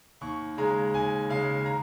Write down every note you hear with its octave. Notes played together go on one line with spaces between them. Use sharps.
D#2 C#6
C#3 G#3 A#5
D#2 G#5
C#3 G#3 F5
A#5